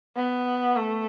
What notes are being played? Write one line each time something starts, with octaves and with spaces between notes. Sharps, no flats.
B3
A3